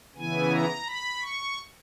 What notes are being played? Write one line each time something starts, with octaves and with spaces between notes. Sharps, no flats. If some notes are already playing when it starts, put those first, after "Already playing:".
C#3 E3 B3 E4 G#5
A#5
B5
C#6